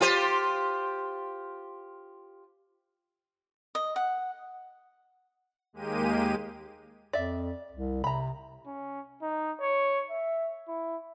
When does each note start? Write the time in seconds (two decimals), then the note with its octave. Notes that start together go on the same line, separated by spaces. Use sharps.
0.01 F4 G4 C5
3.75 D#5
3.96 F#5
5.73 D#2 G#3 A#3 G4 D#7
7.13 F2 D5 E5
7.72 C2
8.04 C3 A#5 B5
8.67 C#4
9.22 D#4
9.61 C#5
10.10 E5
10.68 E4